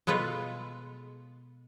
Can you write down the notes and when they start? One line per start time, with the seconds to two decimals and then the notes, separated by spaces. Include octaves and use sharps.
0.07 B2 G#3 B3 F4 G#4 A4